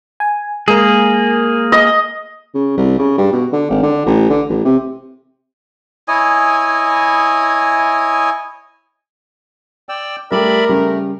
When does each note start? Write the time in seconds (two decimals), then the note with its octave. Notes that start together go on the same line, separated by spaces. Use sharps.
0.20 G#5
0.68 G#3 A#3 G#4 A#4
1.72 D#5
2.55 C#3
2.77 C2
2.99 C#3
3.18 G2
3.32 B2
3.52 D3
3.70 G#1
3.83 D3
4.06 A1
4.30 D3
4.49 A1
4.65 C3
6.08 E4 C#5 D#5 G#5
9.89 D5 G5 E6
10.32 G3 A3 G4 A#4 D5 E5 B5
10.69 C#3 G3 A3